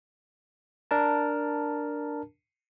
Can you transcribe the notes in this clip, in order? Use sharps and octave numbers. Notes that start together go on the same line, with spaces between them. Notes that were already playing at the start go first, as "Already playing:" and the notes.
D4 A#4 A5